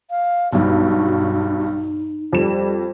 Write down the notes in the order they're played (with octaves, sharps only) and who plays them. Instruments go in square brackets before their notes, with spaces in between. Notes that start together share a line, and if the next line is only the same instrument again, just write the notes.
[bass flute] F5
[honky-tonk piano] B1 G2 [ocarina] D#4 [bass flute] F#4
[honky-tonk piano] F2 E7 [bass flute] G3